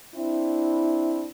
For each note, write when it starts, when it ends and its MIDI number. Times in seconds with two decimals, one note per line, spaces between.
0.15 1.28 60
0.15 1.28 62
0.15 1.28 64